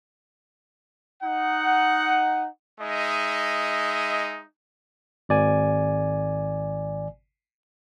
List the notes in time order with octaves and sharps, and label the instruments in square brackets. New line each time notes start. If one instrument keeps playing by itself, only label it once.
[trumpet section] D#4 F#5
G#3 D#4 D#5 E5
[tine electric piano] G#1 D5 G#5